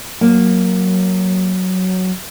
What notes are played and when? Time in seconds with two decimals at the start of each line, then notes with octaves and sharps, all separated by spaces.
0.21 F#3 A#3